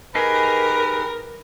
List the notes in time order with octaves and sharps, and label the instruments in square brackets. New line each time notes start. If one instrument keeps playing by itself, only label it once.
[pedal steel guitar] D#4 G4 G#4 [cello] A#4 [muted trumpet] B4